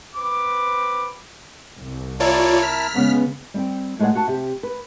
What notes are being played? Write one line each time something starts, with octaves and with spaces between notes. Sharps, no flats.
C4 B4 D6
C2
E4 F4 A#4 C#5 D5 A5
F6 B6
C#3 G#3 B3
G3 C4 G5
A2 G#3 G#4 C#5 D5 F#5
F#4 F#5 A5
C3 G4
B4